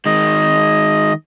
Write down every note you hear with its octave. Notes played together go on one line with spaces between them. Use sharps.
D#3 G#3 D#5